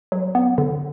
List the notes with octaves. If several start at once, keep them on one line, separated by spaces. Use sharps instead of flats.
F#3
B3
D3